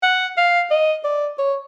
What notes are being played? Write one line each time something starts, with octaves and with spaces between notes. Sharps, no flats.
F#5
F5
D#5
D5
C#5